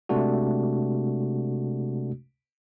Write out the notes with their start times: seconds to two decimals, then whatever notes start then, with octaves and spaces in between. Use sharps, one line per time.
0.09 C3 G#3 A3 D4 F#4